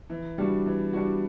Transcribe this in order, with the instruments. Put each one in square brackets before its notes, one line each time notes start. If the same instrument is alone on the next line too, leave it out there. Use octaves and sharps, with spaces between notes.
[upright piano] E3
G3 D4 F#4
E3
G3 D4 F#4